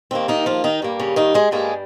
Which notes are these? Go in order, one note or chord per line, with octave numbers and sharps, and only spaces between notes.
D#2 D#3 A#3 C4
D#3 D#4
F3 F4
D#3 D#4
G2 G3 A#3
C#3 C#4
D#3 D#4
G#3 G#4
G2 G3 G#3 A#3 G#4